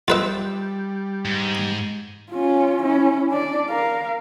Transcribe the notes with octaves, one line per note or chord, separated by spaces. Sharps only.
G3 F4 B4 E5
G#2
C#4 F4
C#4 E4
D4 D5
A#4 F5